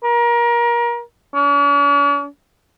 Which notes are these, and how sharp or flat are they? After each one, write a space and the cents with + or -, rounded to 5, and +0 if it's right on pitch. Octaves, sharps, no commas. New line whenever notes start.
A#4 +30
C#4 +45